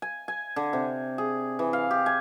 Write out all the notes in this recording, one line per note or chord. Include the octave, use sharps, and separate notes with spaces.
G#5
G#5
D3
C3
G#4
E3
F5
G4
G#5